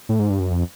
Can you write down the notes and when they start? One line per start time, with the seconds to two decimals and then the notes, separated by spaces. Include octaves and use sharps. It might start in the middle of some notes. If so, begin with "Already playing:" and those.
0.09 A2
0.19 G#2
0.30 G2
0.39 F#2
0.50 F2